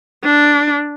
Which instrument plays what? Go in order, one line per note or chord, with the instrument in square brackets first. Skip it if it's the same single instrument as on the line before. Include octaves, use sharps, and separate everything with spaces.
[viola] D4